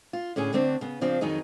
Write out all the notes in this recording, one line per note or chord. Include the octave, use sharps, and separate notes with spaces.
F4
A2 D3 C#4 G#4
D2 D3 A3 C4 D4
C#3 B3
C#3 F3 C4 D4
F2 D#3 F#3 D#4 G#4